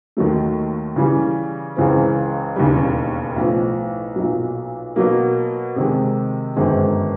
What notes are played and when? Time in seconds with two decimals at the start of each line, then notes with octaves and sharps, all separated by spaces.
0.17 D#2 D#3 F#3 A3
0.96 C#3 E3 G3
1.77 C#2 C#3 E3 G#3 C4
2.56 E1 D#2 C#3 E3 G3
3.36 B1 A2 F3
4.16 B1 A#2 F#3
4.96 B2 F#3 A#3
5.76 C3 D#3 G#3
6.56 G1 F#2 D#3 G#3 C4